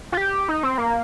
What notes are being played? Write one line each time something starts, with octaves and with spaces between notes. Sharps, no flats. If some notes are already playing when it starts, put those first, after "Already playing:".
F4
G4
D#4
C4
A#3